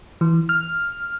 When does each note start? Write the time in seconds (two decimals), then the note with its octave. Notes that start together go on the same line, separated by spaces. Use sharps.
0.21 E3
0.49 F6